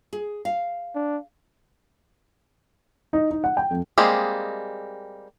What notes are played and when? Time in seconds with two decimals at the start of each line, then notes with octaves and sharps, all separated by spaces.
0.13 G#4
0.45 F5
0.95 D4
3.13 D#4
3.31 D#4
3.44 F#5
3.57 G5
3.71 F2
3.98 G3 G#3 A#3 C4 G#4